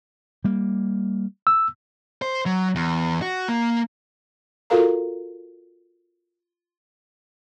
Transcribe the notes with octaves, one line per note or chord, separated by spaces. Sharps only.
G3 A#3
E6
C5
F#3
E2
F#4
A#3
F4 F#4 A4 A#4 F5 A#5